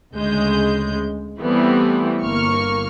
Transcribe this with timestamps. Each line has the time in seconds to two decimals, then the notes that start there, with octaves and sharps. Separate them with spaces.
0.15 D2 C#3 G#3 G6
1.40 E3 G3 A3 B3 C4 E4
2.23 G1 A#3 C#6 F6